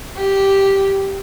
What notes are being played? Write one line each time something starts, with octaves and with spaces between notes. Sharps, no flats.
G4